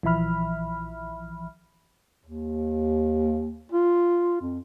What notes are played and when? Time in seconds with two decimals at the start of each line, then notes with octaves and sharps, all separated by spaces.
0.03 A#1 E3 F3 E5 B5 F6
2.26 D#2
3.72 F4
4.41 F2